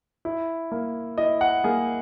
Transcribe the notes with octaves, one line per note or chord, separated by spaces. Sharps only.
E4
A#3
E4 D#5
F#5
A#3 G#4